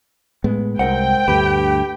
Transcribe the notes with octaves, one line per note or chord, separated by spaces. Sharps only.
A2 G#3 B3
C2 G#2 C4 A#4 F#5 G5
D2 G2 A3 G4 B4